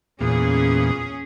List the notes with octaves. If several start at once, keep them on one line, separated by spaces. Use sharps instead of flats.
E2 A#2 C#4 G#4